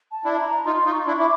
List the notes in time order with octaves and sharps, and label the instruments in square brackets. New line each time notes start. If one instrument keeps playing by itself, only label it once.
[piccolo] A5
[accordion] D4 E4
[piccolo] A#5
[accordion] D#4 F4 [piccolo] C6
[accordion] D#4 F4
[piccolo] C#6
[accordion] D4 E4
[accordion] E4 [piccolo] D6